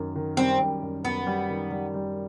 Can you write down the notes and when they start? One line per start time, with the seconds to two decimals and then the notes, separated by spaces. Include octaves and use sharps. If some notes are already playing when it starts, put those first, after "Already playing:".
Already playing: F#2 D#3
0.16 D#3
0.37 G3 C4
0.59 F#2
0.83 F#2
1.04 F#2 B3
1.27 G3
1.49 D#3
1.71 G3
1.94 G3